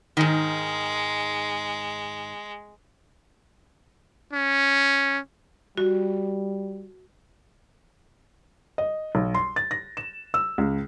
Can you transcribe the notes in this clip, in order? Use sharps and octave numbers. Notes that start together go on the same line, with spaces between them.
G#2 D#3 G#3
C#4
G3 F#4
D#5
B1
C6
A6
A#6
E7
E6
C#2